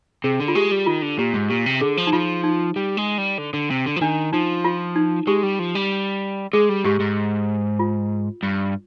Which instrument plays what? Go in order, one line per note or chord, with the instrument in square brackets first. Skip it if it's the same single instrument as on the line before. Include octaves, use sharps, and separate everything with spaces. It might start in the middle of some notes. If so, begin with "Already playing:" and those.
[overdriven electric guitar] C3 [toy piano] G#4
[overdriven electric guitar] D3
[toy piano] F4
[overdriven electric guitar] G#3 [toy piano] G4
[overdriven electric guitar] G3
[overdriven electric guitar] D#3 [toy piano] F4
[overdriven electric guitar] D3
[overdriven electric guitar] A#2 [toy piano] G4
[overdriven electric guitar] G#2
[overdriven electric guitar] A#2 [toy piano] G4
[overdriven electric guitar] C3
[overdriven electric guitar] D3 [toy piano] G#4
[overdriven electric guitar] F3
[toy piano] D#4
[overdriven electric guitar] F3 [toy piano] F4
[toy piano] D#4
[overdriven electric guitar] G3
G#3
G3
D3
D3
C3
D3
F3
[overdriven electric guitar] D#3 [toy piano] D4
[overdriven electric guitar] F3 [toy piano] D#4
[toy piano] F4
D#4
[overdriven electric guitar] G#3 [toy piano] G4
[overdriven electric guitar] G3
F3
G3
[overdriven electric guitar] G#3 [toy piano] G#4
[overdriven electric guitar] G3
[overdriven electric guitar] G#2 [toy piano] G4
[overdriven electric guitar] G#2
[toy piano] F4
[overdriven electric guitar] G2